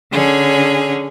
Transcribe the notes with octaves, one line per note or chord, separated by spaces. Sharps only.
D3 C#4 G#4